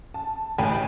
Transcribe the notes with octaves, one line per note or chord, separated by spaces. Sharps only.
A5
A1 G5 G#5 B5